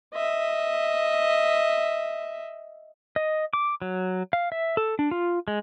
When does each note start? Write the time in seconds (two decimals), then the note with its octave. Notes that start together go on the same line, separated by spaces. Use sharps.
0.14 D#5 E5
3.16 D#5
3.53 D6
3.82 F#3
4.33 F5
4.52 E5
4.77 A4
4.99 D4
5.11 F4
5.48 G#3